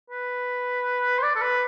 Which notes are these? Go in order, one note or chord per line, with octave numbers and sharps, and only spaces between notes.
B4
C5
D5
A4
B4